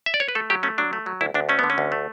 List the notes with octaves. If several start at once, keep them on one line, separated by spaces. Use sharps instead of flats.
E5
D5
C#5
B4
A3 A4
F#3 G4
A3 C#4
F#3 D4
A3
F#3
D2 E4
D2 D4
A3 C#4
D3 B3
C#4
D2
A3